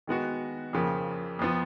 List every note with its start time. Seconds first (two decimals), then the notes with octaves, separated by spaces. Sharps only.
0.07 D#3 G#3 B3 F#4
0.73 F2 C#3 F3 A#3
1.39 F2 F3 B3